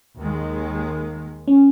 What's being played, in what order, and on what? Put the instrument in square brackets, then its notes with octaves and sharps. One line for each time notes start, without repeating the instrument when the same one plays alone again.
[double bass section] D#2 D#3 G#3
[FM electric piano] C#4